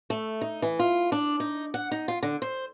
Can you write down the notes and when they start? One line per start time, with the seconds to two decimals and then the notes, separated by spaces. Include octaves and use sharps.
0.10 A3
0.41 D#4
0.62 E3
0.79 F4
1.12 D4
1.40 D#4
1.74 F#5
1.91 D#4
2.08 F4
2.23 D3
2.42 C5